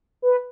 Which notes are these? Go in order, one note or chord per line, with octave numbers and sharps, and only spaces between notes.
B4